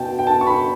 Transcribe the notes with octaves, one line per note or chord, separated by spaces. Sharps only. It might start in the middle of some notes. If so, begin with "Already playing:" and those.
Already playing: B2 G5 A5
G5
A5
C#6
B5